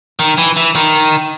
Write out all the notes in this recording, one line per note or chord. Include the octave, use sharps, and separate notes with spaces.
D#3
E3
E3
D#3